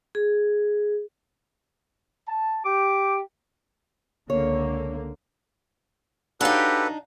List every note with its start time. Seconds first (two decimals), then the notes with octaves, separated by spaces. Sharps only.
0.15 G#4
2.28 A5
2.65 G4 D6
4.30 C#2 D3 A#3 C#5
6.41 D4 D#4 F#4 G4 A4 B4 C#5 F5